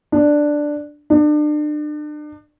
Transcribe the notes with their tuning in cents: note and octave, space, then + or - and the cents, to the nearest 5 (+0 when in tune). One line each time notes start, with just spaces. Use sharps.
D4 +5
D4 +35